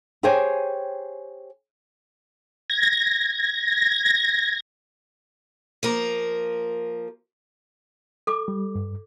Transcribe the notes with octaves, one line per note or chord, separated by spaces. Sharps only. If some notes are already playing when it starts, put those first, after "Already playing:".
G4 G#4 C5 C#5 G5 G#5
G#6 A#6
F3 A#3 A#4
A4 D6
G3
G2